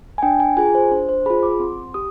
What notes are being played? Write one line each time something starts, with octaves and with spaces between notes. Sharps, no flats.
G#5
D4 G5
G#5
F4 G#4 G#5
C5
D4 C5
C5
F4 G#4 B5
D6
C4 C6
G4 D#6